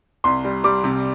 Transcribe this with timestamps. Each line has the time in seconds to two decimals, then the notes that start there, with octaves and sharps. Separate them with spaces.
0.24 C2 C6
0.44 G3
0.64 G3 D6
0.84 C3